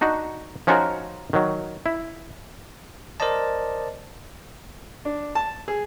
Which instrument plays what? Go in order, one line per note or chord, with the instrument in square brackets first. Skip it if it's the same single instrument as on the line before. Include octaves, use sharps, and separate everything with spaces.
[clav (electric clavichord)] D4 D#4 F#4
F3 C#4 D#4 F4 F#4 A#4
D#3 F#3
E4
[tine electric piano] A#4 C5 D5 D#5 A5
[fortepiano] D4
A5
G#4